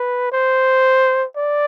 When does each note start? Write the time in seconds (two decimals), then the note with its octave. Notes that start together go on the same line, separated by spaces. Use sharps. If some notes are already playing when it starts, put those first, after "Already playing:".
Already playing: B4
0.32 C5
1.37 D5